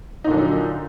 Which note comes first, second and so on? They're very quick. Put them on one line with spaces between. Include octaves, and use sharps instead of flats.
D#4 A#2 D3 F#3